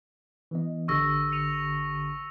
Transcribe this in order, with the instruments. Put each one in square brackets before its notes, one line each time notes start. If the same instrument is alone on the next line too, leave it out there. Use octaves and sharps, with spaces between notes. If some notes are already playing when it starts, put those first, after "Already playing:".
[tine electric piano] E3 B3 D#5
[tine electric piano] A1 D3 G4 [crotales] C#6 E6 A#6
[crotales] C#7 D#7 F7